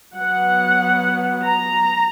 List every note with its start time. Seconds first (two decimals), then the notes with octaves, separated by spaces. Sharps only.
0.15 F#3 B3 F#5
1.45 A#5